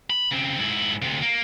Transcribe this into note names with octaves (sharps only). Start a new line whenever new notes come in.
B5
C#3 C4
G#2 E4
D2 C3
A#3